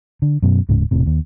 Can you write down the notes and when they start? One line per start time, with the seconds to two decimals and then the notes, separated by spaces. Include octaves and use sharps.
0.22 D3
0.42 F#2 B2
0.69 D1 G#2 C#3
0.91 E1 A2 C3
1.06 D#2